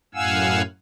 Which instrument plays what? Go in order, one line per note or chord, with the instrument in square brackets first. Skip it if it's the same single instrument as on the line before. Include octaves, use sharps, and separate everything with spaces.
[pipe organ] F#2 A2 F5 F#5 G#5 E6